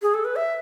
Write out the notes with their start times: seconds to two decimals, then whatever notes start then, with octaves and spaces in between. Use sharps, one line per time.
0.02 G#4
0.14 A4
0.25 B4
0.36 E5